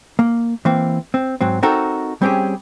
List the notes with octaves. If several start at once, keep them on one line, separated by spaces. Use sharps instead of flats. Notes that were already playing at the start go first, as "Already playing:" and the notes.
A#3
E3 A#3 C4
C4
G#2 F#3 C4
C4 D#4 F#4 A4 A#4
G3 C4 C#4 G4 G#4